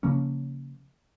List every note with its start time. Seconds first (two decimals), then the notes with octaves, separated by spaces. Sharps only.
0.03 C#3 F3 A#3 C#4